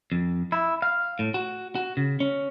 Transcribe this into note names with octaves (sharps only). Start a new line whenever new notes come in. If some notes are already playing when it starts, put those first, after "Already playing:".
F2
E4
F5
A2
F#4
F#4
C#3
C#4